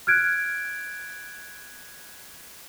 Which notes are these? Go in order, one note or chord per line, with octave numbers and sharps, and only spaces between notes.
F6 F#6 G#6 D7